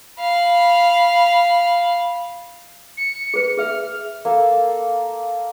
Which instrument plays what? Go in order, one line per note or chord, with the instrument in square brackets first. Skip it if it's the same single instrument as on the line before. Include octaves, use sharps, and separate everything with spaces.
[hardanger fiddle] F5 B5
[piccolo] C#7
[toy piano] G#4 B4
[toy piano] G#4 E5 [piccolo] F6
[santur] A#3 A4 F5